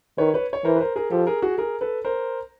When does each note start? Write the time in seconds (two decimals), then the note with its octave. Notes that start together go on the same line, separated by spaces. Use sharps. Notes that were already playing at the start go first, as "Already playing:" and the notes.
0.18 D#3 B4 C#5
0.34 B4 C#5
0.53 C#5
0.65 E3 A#4 C5
0.76 B4
0.80 A#4 C5
0.96 G#4 A#4
1.11 F3 G4 A4
1.27 G#4 A#4
1.42 F#4 G#4
1.58 G#4 A#4
1.81 A4 B4
2.05 A#4 C5